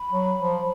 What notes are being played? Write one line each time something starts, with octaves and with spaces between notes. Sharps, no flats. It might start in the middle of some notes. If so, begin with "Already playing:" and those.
Already playing: B5
F#3
F3